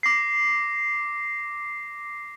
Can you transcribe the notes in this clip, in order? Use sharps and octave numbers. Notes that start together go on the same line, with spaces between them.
D6 A#6 C7